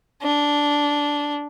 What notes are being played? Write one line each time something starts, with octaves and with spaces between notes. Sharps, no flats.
D4